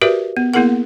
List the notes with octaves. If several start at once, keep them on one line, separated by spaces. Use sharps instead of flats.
F#4 G4 A#4 B4 D5 E5
B3
A#3 B3 E4 G#4 A#4 F#5